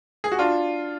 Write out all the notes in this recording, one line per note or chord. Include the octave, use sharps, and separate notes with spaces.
G#4
F#4
D4 F4